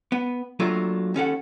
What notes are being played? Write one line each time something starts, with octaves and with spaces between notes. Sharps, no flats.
B3
F#3 A3 A#3 D4 F4
D#2 C#4 A4 F#5